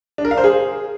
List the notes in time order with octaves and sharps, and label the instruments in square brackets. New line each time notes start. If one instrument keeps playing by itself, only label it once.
[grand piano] D4
A#4
F5
C5
G#4